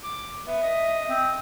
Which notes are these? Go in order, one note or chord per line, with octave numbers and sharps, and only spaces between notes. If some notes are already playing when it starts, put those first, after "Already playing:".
D6
B3 E5
D#5
C4